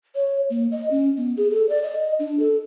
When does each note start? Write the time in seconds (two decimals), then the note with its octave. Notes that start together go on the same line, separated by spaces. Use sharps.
0.15 C#5
0.50 A#3
0.72 D#5
0.91 C#4
1.17 B3
1.37 G#4
1.51 A4
1.69 D5
1.83 D#5
2.19 D4
2.39 A4